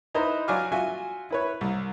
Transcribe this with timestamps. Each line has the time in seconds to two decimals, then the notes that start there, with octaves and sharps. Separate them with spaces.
0.15 D#4 E4 B4 C5 A#5
0.48 F#3 D5 F5 G#5 D6 F6
0.72 F4 F#4 E5 G#5
1.31 E4 B4 C#5
1.61 C2